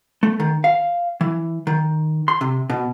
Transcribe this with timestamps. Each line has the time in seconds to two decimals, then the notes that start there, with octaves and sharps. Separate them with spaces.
0.23 A3
0.40 D#3
0.64 F5
1.21 E3
1.67 D#3
2.28 C6
2.41 C3
2.70 B2